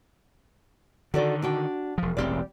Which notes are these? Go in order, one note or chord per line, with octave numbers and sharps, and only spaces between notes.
D3 D#3 F#4 A4 D5
D4 F#4 G5
E1 F3
E1 A1 G3 C4 G4 D5